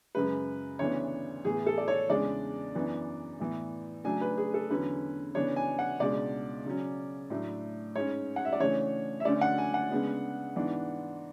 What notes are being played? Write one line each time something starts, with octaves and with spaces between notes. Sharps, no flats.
F#2 C#3 G#3 B4
D2 C#3 E3 B3 D4 C#5
A2 E3 B3 G#4
A4
D5
C#5
E2 C#3 G#3 D4 D5
F#2 E3 B3 D4
A2 E3 B3
C#3 F#3 A3 D4 G#5
B4
G#4
A4
E2 D3 F#3 C#4 B4
C#3 E3 B3 D4 C#5
G#5
F#5
C#2 B2 G#3 D4 D5
C#3 F#3 C#4
A2 F#3 A3 D4
G#2 G#3 C#4 C#5
F#5
E5
D5
C#3 E3 A3 D4 C#5
E5
D2 D3 A3 C#4 D5
F#5
G#5
F#5
C#3 G#3 B3 D4
G#2 E3 B3 D4